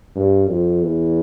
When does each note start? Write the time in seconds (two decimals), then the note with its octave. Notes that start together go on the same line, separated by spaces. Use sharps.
0.16 G2
0.49 F2
0.84 E2